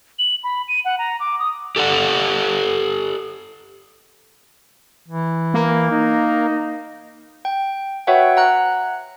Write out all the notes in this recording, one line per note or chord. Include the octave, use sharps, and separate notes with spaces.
F#7
B5
D#7
F#5
A#5
D6
D#6
G4 A4 D5 F#5
E3
A#3
D#4
G5
F#4 B4 C#5 E5 F#5 G5
F#5 A#5 F#6